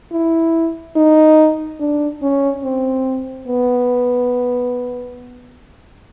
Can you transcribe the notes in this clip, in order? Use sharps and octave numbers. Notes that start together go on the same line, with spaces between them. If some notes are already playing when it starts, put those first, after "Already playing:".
E4
D#4
D4
C#4
C4
B3